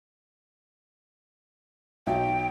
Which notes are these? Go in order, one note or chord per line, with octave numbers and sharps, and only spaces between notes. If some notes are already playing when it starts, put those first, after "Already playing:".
B1 F#3 G5